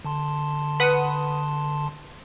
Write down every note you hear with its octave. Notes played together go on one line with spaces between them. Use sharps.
D3 A5 C6
B4 F#5 D#6